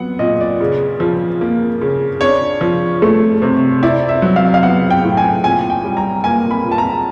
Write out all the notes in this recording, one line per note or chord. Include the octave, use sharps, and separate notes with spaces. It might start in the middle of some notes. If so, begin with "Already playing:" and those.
Already playing: F#3 B3 F#5
A#2 D#5
D5
C#3
F3
A#3
C#3
D4 C#5
F3
A3
C3
E4 D5
E5
F#3
F5
F5
B3 F#5
G5
A2
G#5
A#2 G#5
G5
G3
A#5
A#3 G#5
B5
A#2
A5
A#5